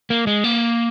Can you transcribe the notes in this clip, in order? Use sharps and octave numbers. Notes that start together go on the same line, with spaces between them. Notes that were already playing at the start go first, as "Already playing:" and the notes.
A#3
G#3
A#3